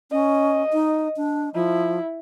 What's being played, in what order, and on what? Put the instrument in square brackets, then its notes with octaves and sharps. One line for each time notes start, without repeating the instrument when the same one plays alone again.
[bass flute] C#4 [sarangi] D#5
[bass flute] D#4
D4
[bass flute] F3 [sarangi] E4